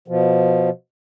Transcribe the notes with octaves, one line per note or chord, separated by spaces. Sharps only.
B2 F3